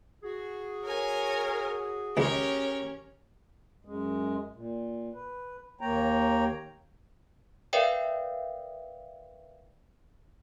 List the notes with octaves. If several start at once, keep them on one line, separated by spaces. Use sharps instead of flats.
F#4 G#4
A#4 C#5 G#5
C#2 G#3 C#4 G4 A#4 C#5
F#2 G#3
A#2
B4
D#2 A#3 C#5 G5 A#5
A#4 B4 D5 E5 F5 G5